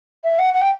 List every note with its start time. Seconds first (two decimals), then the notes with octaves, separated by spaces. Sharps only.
0.24 E5
0.39 F#5
0.54 F#5
0.61 G5